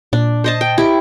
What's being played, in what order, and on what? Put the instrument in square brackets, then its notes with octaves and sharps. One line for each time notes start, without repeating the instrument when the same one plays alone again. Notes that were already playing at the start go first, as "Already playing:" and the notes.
[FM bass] A#2 [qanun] D4
[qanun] C5 D#5 A5
G5
E4 G4